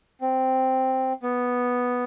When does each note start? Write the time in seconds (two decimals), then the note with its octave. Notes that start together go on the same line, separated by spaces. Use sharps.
0.21 C4
1.23 B3